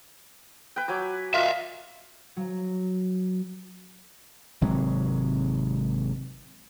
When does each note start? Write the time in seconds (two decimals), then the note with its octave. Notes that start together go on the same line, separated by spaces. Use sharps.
0.76 B4 G5
0.88 F#3 G#5 D6
1.34 F4 A#4 E5 F5
2.37 F#3
4.61 G#1 C3 F#3 G#3